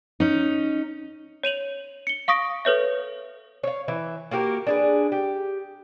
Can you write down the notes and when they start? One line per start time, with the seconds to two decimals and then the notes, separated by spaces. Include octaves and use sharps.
0.20 C#4 D#4
1.43 C#5 D#7 F7 F#7
2.07 C#7 G7
2.28 F5 C#6 D#6 A#6 D7
2.65 A4 B4 C#5 E5
3.63 C#5 F5
3.88 E3 E5
4.31 A#3 F#4 G4 A#4
4.67 D4 G#4 B4
5.12 G4